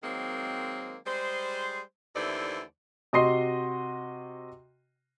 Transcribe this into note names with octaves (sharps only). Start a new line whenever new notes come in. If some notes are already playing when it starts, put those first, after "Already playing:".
D#3 F#3 G#3 A#3 C4
G3 G#3 G#4 C5
D#2 D3 E3 A3 C5 D5
C3 F#4 D#5 C6 C7